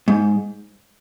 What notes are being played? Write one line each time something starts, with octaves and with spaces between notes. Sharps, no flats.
G#2